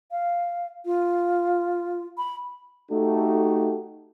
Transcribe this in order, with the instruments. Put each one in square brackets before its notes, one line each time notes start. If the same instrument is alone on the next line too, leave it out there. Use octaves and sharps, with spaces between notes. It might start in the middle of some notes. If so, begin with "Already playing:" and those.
[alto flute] F5
F4
B5
[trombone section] A3 D#4 F#4 G4 A4